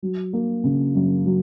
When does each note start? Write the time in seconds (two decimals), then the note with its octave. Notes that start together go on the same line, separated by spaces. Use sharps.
0.03 F#3
0.33 A#3
0.64 C#3
0.95 F#2
1.25 F#3